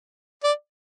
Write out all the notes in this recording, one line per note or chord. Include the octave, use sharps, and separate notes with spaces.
D5